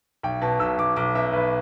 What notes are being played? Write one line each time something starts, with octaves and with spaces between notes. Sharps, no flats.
B1 G5
B2 A5
B1 E6
B1 D6
B1 D6
B2 E5
B1 B4